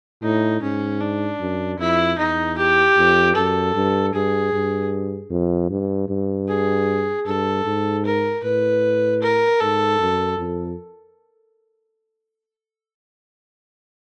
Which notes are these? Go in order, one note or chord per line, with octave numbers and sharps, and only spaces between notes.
A2 D#4
G#2 C#4
D4
F#2
F2 E4
E2 D#4
G4
F2
F#2 A4
G2
G2 G#4
G2
F2
G2
G2
G#4
G2 A4
G#2
A#4
A2 B4
A#4
G#2 A4
F#2
F2